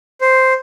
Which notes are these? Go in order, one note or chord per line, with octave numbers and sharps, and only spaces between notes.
C5